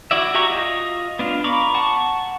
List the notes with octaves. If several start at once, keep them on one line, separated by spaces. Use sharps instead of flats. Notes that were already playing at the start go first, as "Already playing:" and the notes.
E4 F#4 D5 E5
F#4 G4 E5 A#5 C#6
F4 D#5
B3 D4 F4
A#5 B5 C#6 D6
F#5 A5 C#6